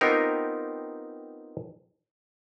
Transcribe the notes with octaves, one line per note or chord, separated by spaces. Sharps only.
B3 C4 D#4 F4 G4 A#4